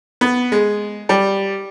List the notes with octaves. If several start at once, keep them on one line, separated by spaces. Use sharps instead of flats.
B3
G#3
G3